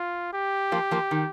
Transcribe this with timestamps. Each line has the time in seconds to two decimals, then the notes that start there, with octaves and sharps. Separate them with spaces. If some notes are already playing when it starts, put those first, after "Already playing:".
Already playing: F4
0.33 G4
0.72 F3 A#3
0.91 F3 A#3
1.11 D#3